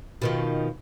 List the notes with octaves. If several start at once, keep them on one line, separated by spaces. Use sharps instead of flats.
B2 D#3 F3